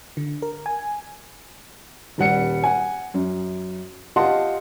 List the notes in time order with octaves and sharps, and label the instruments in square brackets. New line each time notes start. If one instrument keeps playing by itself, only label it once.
[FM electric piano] D3
A#4
G#5
[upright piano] D#1 G3 F#5 C#7
F#5 G#5
F#2
F4 G4 D#5 F#5 A5 C6